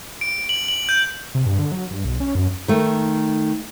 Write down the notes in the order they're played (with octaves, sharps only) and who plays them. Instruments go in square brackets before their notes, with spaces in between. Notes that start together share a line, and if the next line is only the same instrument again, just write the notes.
[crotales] D7
F#7
F#7
G6
[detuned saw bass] C3
G2
D3
F#3
G2
B1
C#4
F#2
[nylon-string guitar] D#3 A3